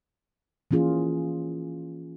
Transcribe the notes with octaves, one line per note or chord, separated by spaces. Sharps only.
E3 A#3 C#4 F4 G#4